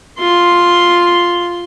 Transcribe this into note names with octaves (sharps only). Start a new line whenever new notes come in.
F4 C6